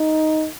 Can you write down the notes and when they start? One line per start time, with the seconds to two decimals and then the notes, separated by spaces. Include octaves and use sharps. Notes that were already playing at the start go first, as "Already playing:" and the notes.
Already playing: D#4